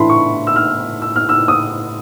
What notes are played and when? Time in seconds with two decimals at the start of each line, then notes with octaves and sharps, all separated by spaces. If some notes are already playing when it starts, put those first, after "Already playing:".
Already playing: A2 E3 A3 D4 B5 C6
0.09 C#6
0.47 E6
0.56 F6
1.02 E6
1.16 F6
1.29 E6
1.48 D#6